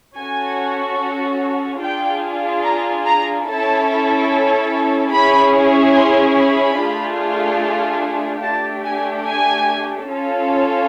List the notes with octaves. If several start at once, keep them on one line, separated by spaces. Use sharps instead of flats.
C#4 F#4 A4 G#5
D4 F4 G#4 G5
A#5
A#5
C#4 E4 A4 A5
C#4 E4 G#4 B5
C6
B5
A3 D4 F4 G#4
A3 D4 G4 A5
G#5
G#5
C#4 F4 A4